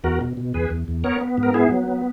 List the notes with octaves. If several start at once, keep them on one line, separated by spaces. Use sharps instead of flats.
E2 F#4 A#4
B2
B2
E2 G#4 B4
E2
E2
B3 A#4 C#5
B3
G#2
A#4
B3 E4 G#4
F#3
B3